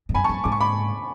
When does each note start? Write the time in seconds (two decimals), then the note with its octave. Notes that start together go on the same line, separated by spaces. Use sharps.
0.09 G#2
0.14 F#2 G#5 B5
0.24 A5 C#6
0.29 F#2
0.44 G#2 D6
0.52 C#6
0.61 B5 D6